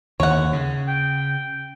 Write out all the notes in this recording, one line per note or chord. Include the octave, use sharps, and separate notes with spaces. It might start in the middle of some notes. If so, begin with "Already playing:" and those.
D#2 D3 C#5 F#5
C#3
G5